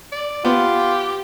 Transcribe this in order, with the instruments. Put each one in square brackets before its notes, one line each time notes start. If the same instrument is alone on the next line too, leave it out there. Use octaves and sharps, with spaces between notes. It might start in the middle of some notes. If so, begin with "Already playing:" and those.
[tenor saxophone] D5
[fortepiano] B3 [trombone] F4 [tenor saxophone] G4